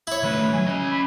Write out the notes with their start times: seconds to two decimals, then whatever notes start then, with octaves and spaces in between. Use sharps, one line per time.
0.07 E4 C#5
0.23 D#3 A3 B4
0.53 F#3 G#5
0.67 C#4 D#5
0.92 B5